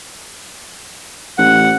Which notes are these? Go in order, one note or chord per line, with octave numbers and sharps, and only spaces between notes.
A1 F#5